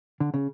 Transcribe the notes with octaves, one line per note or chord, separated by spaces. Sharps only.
D3
C#3